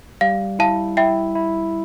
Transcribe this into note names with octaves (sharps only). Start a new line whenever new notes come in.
G3 F5
E4 F5 A5
E4 E5 G5
E4